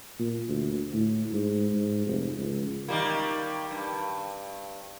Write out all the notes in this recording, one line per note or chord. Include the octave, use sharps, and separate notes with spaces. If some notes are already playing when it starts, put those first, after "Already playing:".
A#2
D2
A2
G#2
G#2
F1
C#2
D#3 G3 A#3
G2